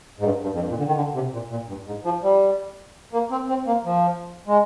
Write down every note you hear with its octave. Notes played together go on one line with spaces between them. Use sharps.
G#2
G2
G2
F2
G2
A#2
D3
D#3
D3
C3
A#2
A#2
G2
G#2
F3
G3
A#3
C4
C4
A#3
F3
G#3